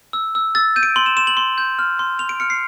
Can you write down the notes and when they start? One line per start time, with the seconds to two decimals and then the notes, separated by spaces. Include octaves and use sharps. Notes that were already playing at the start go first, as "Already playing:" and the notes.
0.13 E6
0.35 E6
0.55 E6 A6
0.76 G6 D#7
0.83 D7
0.96 C6 F#7
1.06 E7
1.17 C6 E7
1.27 F#7
1.37 C6
1.58 G6
1.79 F6
1.99 C6
2.19 C6 F7
2.29 D7
2.40 F6 C#7
2.50 C7